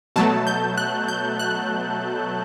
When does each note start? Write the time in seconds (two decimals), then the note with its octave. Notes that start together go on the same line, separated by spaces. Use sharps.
0.16 B2 F#3 A3 A5
0.47 G6
0.77 F#6
1.08 G6
1.39 F#6